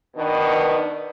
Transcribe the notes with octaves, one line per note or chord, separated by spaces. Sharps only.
B2 D#3 B3 D4